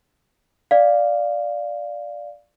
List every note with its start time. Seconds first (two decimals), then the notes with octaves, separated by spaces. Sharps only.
0.71 D5 F5